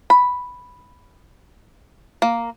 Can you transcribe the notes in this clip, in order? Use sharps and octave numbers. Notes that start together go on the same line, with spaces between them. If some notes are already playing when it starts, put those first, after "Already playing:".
B5
A#3